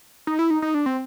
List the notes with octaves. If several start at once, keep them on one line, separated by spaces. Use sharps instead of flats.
D#4
E4
D#4
D#4
D4
C4